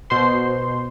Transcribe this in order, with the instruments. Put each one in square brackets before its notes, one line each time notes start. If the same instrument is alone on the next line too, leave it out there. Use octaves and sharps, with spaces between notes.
[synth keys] B2 C5 C6